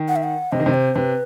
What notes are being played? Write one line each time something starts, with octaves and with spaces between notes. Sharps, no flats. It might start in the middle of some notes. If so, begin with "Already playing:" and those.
Already playing: D#3
F#5
E5
F#5
C3 D#5
D#3
C3
C5
C3 B4